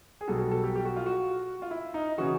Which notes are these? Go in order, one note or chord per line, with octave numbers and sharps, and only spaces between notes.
G#4
B1 B2 G3 A4
A4
A4
G4
G4
F#4
F4
F#4
F4
E4
D#4
C#3 E3 F#4